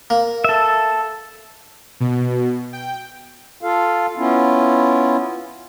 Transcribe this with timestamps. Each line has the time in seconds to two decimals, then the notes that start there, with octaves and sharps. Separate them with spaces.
0.10 A#3
0.44 A4 E5
2.00 B2
2.73 G5
3.62 F4 A4 F5
4.17 B3 C#4 E4 F4